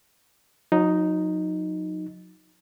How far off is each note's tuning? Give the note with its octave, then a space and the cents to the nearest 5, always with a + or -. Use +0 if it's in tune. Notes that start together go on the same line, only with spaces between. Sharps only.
F#3 -35 D#4 +0